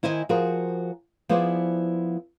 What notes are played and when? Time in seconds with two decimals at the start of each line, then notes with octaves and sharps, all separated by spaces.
0.03 D#3 E4 C5 D#5 G#5
0.29 F3 F#4 G#4 A#4 C5
1.29 F3 B3 E4 G#4 C5 D5